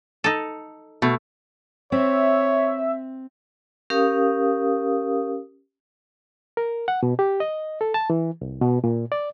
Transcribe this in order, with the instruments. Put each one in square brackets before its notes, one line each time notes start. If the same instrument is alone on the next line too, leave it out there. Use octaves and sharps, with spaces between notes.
[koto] D#4 A4
[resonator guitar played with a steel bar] B2 [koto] A3
[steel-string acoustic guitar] C4 [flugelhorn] C#5 [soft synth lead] E5
[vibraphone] C#4 G4 A#4 F5 D#6
[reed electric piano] A#4
F#5
B2
G4
D#5
A4
A5
E3
C2
B2
A#2
D5